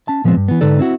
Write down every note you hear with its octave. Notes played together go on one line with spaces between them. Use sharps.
C#4 A5
A#2 F3 G#3 B3 C4
G2
E3 B3
G#2 D3 D#4 A4 B4 D5
C4 E4 F#4